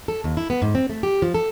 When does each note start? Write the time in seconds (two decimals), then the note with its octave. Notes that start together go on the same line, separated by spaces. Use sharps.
0.08 A4
0.24 D#2
0.37 E4
0.50 B3
0.62 G#2
0.75 C4
0.90 A3
1.03 G4
1.22 F3
1.34 A4